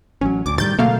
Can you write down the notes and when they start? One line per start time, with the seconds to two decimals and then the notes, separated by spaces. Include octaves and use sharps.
0.21 A1 F#3 C#4
0.46 D2 D6
0.58 A2 D#3 G3 G6 A6
0.79 B2 D3 F#3 A3 A#3 F5